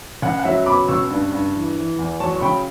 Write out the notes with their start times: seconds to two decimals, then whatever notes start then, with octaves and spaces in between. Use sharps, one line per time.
0.22 C#2 F#5
0.39 F#5
0.45 F#3 E5
0.66 B2 B5 D6
0.88 C#2 C#6 E6
1.10 G2
1.32 G2
1.55 E3
1.77 E3
1.99 E2
2.20 F#3 A5 C#6
2.36 C#6
2.41 C#3 G5 B5